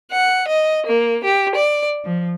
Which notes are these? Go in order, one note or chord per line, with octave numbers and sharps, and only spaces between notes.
F#5
D#5
A#3
G4
D5
F3